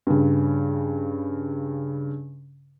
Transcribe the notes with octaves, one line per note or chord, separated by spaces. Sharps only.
G2 C#3